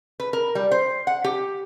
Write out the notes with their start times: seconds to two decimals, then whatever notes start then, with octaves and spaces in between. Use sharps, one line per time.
0.20 B4
0.33 A#4
0.55 G3
0.71 C5
1.07 F#5
1.24 G4